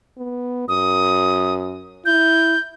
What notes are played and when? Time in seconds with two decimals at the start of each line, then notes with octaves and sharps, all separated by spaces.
0.18 B3
0.68 F#2 D#6
2.06 E4 G6